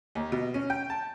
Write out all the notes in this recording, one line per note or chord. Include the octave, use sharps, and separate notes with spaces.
D#2
B2
C#4
G5
A5